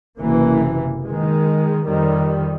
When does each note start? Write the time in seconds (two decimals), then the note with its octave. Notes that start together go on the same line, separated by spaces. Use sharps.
0.19 F#1 C3 E3 A#3
1.04 D#3 G#3
1.87 F2 D#3 G3